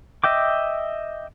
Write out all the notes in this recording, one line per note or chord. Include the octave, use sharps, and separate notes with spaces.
D#5 E5 G5 D6